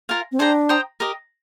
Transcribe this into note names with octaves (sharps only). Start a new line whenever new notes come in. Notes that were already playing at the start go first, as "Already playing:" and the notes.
F4 A#4 F5 G#5
C4
D4 G#4 C5 G5 A#5
C5 G5 A#5 D#6
G4 A#4 D#5